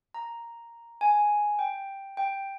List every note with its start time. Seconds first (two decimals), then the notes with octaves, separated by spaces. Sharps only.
0.14 A#5
1.01 G#5
1.59 G5
2.17 G5